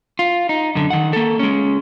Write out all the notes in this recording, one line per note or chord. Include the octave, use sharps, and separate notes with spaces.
F4
D#4
F#2 D3
D#3 F#5
A#3 A4
G#3 C#4